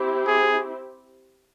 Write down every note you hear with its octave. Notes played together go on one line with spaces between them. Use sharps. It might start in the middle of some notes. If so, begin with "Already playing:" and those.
Already playing: C4 E4 G4 C5
G#4